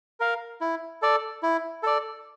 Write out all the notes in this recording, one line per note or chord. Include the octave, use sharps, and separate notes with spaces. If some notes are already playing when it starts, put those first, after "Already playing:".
A#4 F5
E4
A4 D5
E4
A4 D5